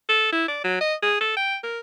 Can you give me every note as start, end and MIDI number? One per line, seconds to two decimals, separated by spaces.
0.09 0.30 69
0.32 0.48 64
0.48 0.62 74
0.64 0.80 54
0.81 0.94 75
1.03 1.18 68
1.21 1.33 69
1.37 1.57 79
1.64 1.80 70